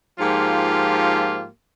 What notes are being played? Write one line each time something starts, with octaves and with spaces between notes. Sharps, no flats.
G#2 F3 A#3 F4 G4